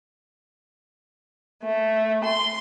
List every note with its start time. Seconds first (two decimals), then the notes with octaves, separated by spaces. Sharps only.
1.63 A3
2.24 C6